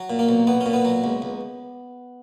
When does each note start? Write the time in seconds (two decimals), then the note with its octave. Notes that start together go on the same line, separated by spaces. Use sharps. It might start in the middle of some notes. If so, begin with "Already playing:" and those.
Already playing: F#3
0.10 A#2
0.19 A#3
0.29 B1
0.47 B1 B3
0.61 C#4
0.66 A#2
0.73 B3
0.85 F#3
1.04 C#2
1.22 C#2